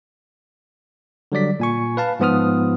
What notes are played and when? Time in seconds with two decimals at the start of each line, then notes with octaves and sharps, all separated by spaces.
1.32 D3 F#3 G3 D5 B6
1.60 A#2 G#5 C#6
1.97 B4 F5 A5
2.20 G#2 F3 B3 F4 D#6 F6